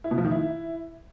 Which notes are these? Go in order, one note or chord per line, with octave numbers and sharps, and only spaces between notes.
E4
B2
F3
D#3
E4